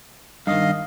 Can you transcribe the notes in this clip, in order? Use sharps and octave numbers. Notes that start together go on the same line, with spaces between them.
G2 D#3 D#5 F5